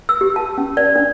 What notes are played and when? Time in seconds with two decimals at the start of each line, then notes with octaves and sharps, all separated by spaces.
0.09 E6
0.21 G4
0.36 A5
0.58 C#4
0.77 D5
0.96 D4